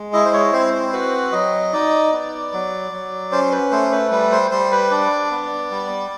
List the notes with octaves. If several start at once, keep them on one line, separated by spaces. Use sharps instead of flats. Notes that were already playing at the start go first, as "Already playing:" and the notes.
Already playing: G#3
E4 D#5
C5
C#5
C4 C5
C5
F#4 B4
F#3 D#5
D#4 D5
B3
F#3
F#3
C#4 C5
B4
A3 C5
B4
G3 B4
C5
G3 C5
B4
D4 D5
B3
G3